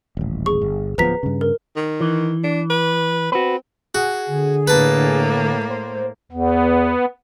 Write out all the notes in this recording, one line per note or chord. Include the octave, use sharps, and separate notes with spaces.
D#1 A1
G#4 C#6
G1
D1 F3 B3 B4 A#5 B6
G2 C#3
A#4
D#3
E3
D4
B4
C4 F#4 B4
F#4 G#4
D3
A2 A#3 B4 A5
C5
E2 B3